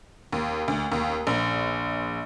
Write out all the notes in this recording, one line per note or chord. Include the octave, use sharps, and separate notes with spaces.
D#2
D2
D#2
A#1